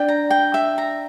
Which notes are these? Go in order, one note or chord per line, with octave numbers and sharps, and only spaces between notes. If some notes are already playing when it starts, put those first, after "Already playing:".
Already playing: D4 G5
A#5
G5
E5
A#5